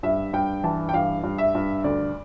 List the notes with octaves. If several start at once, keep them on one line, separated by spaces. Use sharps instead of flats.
G2 E5
G2 G5
E3 A5
G5
G2 F5
G2
E5
G2
D2 D5